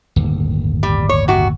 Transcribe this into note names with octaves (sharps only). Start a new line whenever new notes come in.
D1 G1 D#2
G3
C#5
C3 F#4